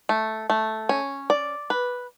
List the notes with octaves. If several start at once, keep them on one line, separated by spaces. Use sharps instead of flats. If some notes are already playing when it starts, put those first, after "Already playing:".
A3
A3
C#4
D5
B4